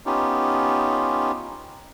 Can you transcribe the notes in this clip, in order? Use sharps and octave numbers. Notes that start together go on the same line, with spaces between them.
B3 C#4 D#4 F4 G4